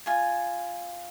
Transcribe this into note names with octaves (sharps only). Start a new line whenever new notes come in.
F4 G#5